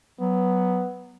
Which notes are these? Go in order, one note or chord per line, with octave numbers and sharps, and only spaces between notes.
F#3 B3